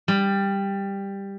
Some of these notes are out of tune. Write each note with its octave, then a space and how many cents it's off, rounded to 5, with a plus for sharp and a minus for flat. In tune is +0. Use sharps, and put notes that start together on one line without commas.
G3 +10